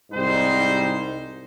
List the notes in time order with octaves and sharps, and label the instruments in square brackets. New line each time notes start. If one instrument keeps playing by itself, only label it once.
[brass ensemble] C2 G#2 G3 D#4 C5